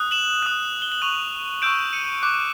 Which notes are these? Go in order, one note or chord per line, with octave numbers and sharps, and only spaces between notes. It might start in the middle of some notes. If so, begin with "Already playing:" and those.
Already playing: D#6 F#6
E7 F#7
D#6 F#6
G7
F#7
C#6 F#6 D#7 F7
C#6 E6 G6 D7 E7
C#7 D#7
D6 F#6